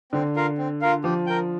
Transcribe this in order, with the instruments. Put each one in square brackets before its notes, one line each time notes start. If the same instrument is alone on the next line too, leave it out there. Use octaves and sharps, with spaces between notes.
[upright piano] D3 [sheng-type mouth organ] C4
[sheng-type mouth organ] F4 A#4 F5
C4
F4 A#4 F5
[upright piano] F3 [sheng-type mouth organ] G4
[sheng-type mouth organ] A#4 G5